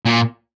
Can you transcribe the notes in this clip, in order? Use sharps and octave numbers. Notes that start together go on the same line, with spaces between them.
A#2